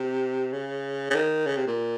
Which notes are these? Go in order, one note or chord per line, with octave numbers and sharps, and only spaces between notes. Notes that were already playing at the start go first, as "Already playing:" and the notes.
Already playing: C3
C#3
C#3
D#3
C#3
C3
A#2